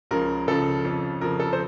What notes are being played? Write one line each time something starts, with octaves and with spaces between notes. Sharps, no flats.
C#2 C#3 F3 A#4
C#2 C#3 F3 A4
F2 C#3 F3
F2 C#3 F3 A#4
A4
C5